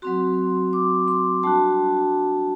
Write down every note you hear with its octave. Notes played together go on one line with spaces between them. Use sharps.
F#3 C4 F#4 C6
D6
C6
G3 D4 F#4 A5